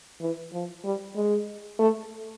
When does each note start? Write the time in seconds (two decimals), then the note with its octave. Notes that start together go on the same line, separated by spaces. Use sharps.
0.21 E3
0.53 F3
0.84 G3
1.16 G#3
1.79 A3